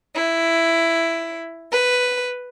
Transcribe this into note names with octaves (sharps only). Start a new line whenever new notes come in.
E4
B4